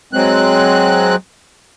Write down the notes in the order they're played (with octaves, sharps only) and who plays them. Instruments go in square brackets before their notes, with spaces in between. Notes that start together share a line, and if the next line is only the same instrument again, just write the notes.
[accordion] F#3 G#3 C4 F#6